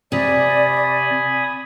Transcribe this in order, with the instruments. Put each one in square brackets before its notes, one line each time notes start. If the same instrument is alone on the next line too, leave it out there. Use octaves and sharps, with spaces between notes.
[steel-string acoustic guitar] C3 [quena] D5 [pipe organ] G#5 B5 D#6